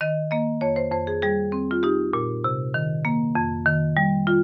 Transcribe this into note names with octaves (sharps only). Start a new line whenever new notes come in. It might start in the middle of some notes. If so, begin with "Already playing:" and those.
D#3 D#5
A#3 D#5
F2 C#5
C5
F2 C5
G#4
G3 G#4
C4
F4
D#4 G4
A#2
C3
D#3
A#3
F2
D#3
G3
F4